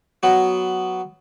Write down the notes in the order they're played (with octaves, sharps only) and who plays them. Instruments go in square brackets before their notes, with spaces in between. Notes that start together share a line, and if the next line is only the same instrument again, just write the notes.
[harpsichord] F#3 B3